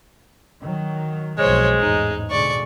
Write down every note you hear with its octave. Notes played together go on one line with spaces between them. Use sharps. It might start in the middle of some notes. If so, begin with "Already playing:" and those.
D#3 F#3
B1 F2 F3 G#3 C5 C#5
A1 E2 G#2 D#4
B2 D3 G#3 D5 C#6